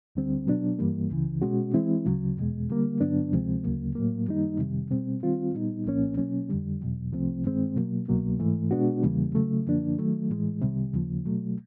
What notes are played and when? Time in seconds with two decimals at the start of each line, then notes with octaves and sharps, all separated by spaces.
0.15 D2 D3 G3 C4
0.47 B2 F#3 B3 D4
0.79 G2 E3 G3 A#3
1.10 C#2 C#3 E3
1.42 B2 G#3 C#4 F#4
1.73 E3 G#3 C4 E4
2.05 D2 C#3 F#3
2.37 E2 B2 G#3
2.69 D3 G3 A#3
3.00 G2 D3 F#3 B3 D4
3.32 D2 C3 F3 G#3 C4
3.64 D2 C#3 F#3 A#3
3.95 A2 F#3 A#3
4.28 F#2 D#3 G3 A#3 D#4
4.59 F2 C3 D#3 G3
4.91 B2 G3 C4
5.23 D#3 G3 C4 F4
5.54 A#2 G3 B3 D#4
5.86 C2 A#2 F3 A#3 C#4
6.17 B2 F#3 A#3 C#4
6.49 F2 D3 G3
6.81 E2 B2 F#3
7.13 C2 C3 F3 A3 C4
7.44 G2 D#3 G#3 C4
7.76 B2 F#3 A#3
8.08 C2 B2 F#3 A#3
8.39 G#2 E3 A3
8.71 B2 G#3 B3 D4 F#4
9.03 E2 C#3 E3 G3 A#3
9.35 C#3 F#3 A3
9.66 F#2 D3 F3 A#3 D4
9.98 D#3 F#3 A3
10.30 A2 E3 G#3
10.61 C2 C3 D#3 G3
10.93 D#2 C#3 F3 A#3
11.25 B2 F#3 A3